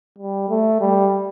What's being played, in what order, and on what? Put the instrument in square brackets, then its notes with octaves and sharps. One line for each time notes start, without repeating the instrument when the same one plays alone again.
[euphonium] G3
A3
G3